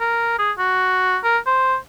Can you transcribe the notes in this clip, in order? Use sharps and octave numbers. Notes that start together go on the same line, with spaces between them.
A#4
G#4
F#4
A#4
C5